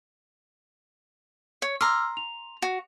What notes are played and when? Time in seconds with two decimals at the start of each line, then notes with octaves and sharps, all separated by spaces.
1.62 C#5
1.81 A#5 C6 D6 E6 F6
2.17 F7
2.62 F#4